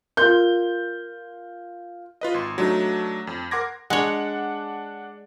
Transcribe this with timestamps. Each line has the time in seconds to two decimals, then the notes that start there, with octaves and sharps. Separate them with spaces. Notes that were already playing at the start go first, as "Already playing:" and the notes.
0.17 F4 A#4 C6 G6
2.21 F4 B4 D#5
2.34 G#1 C6
2.58 F#3 A3 D4 D#4
3.27 F2
3.51 A#4 F#5 C6 D6 G#6 A#6
3.90 G#3 D4 C#5 F#5